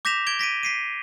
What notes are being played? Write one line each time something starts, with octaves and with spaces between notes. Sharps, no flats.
D6 G6 A#6 B6 E7 F7
G#6 D7 G7
A#6 B6 D7 D#7
B6 C7 D#7